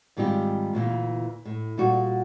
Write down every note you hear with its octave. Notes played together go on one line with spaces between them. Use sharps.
G#2 D#3 G3 C4 F4 G4
D2 A#2 E3 A#3
A2
A#2 G3 F#4